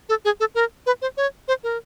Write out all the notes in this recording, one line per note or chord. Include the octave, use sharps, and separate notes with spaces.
A4
G#4
A4
A#4
B4
C5
C#5
C5
A#4